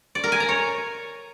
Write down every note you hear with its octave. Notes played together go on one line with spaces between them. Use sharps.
D5
A#4
G#5
A#5
C#5